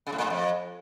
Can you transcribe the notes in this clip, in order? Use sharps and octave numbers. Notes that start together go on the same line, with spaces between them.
C#3
A2
A#2
A2
F2